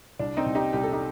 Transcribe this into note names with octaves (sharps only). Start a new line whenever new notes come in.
C2 D4
C4 D#4
C2
D#4 G4
C2 G4
A4
D#4 G4